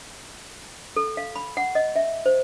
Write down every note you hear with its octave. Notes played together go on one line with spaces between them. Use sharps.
A4
F5
B5
F#5
D#5
E5
C5